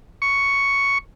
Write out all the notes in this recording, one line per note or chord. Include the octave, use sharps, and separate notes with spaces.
C#6